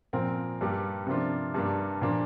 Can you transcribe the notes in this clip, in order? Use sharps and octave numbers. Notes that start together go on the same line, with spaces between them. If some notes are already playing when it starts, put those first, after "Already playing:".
A#2 F3 C4 A#4
G2 G3 A#3 G4
C3 F3 A#3 D4 F4
G2 G3 A#3 D4
A#2 F3 A#3 D4